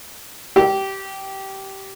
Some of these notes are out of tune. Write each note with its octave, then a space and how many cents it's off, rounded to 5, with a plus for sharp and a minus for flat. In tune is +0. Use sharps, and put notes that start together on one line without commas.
G4 -15